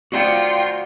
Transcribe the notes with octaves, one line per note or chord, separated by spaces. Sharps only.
F4 F#4 D5 F#5 G5 C6 C#7